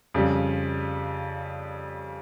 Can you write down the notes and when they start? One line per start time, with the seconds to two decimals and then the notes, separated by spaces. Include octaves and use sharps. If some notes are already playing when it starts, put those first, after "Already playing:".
0.14 F2 C#3 G3